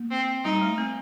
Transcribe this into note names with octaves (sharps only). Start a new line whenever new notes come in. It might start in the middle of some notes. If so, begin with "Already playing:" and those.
Already playing: A#3
C4
G3 D#4
A3
C4